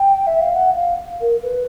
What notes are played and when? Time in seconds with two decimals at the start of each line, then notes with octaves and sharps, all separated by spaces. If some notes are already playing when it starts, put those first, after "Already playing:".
Already playing: G5
0.26 E5
0.40 F5
0.54 F#5
0.76 F5
1.20 A#4
1.43 B4